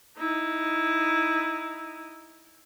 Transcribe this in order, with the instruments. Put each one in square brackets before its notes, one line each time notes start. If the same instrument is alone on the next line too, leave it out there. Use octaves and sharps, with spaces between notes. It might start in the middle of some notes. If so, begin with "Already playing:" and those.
[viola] D#4 E4